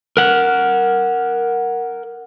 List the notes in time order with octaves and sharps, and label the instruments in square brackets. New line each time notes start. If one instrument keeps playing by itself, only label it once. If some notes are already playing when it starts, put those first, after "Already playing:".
[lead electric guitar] A#4 F#5